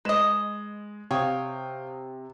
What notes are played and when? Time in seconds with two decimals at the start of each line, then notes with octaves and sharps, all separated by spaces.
0.05 G#3 B4 D#5 E7
1.11 C3 C#5 F5 G5 D#6